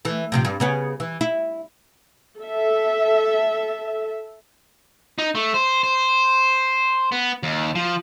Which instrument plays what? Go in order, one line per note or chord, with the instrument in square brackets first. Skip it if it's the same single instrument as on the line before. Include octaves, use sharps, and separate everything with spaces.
[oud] E3 A3
A2 C3 F3
G2
C#3 B3 C#4
E3
E4
[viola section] A4 E5
[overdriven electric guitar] D#4
A3
C5
C5
B3
D#2
F3